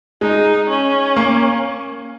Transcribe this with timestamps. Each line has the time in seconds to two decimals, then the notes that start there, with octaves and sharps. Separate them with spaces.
0.21 G#3 D#4
0.69 C#4
1.16 A#3